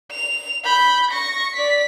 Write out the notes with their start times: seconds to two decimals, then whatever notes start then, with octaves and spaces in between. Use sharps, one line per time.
0.11 F7
0.64 B5 G6
1.11 C#6 A#6
1.54 D5 B6